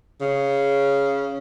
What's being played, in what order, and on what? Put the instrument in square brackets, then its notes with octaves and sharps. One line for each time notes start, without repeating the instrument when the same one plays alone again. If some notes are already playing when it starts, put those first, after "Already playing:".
[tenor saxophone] C#3